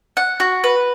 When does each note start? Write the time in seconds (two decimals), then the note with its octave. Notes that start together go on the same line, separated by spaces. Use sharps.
0.17 F#5
0.40 F#4
0.64 B4